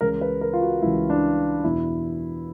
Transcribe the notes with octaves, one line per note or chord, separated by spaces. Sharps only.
C#2 C#3 E3 A#4
B4
A#4
F4
F#4
C#2 C#3 E3 E4
D4
E2 B2 E4